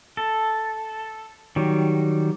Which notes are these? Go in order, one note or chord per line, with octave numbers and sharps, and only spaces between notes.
A4
D#3 F#3 G3